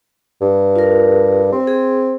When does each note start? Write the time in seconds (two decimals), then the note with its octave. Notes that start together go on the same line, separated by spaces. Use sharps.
0.41 G2
0.76 F4 A#4
1.52 C4
1.67 G#4